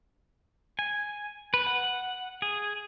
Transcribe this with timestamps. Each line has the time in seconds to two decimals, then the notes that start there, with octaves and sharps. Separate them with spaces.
0.79 G#5
1.54 B4
1.66 F#5
2.42 G#4